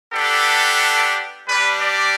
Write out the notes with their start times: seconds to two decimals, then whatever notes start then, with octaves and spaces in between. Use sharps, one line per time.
0.14 B3 D4 G4 A4
1.48 G3 D4 G4 B4
1.82 D5